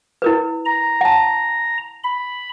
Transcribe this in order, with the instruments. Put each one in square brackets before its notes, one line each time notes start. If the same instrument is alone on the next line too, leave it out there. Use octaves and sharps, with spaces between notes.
[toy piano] E4 A#4 B4
[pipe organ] A#5
[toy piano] F#5 A5
[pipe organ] B5